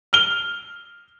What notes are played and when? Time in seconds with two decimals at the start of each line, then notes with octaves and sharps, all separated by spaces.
0.13 F6 F7 G7